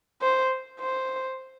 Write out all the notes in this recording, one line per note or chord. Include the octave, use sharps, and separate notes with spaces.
C5
C5